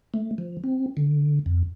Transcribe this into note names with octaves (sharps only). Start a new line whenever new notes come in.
A3
F3
C4
D3
F2